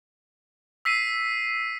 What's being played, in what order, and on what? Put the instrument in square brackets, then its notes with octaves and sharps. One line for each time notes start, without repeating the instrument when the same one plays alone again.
[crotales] E6 B6 C7 D#7